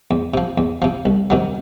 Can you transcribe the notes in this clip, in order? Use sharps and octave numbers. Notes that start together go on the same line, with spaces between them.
E2
C3 F3
E2
C3 F3
C2
C3 D#3 F#3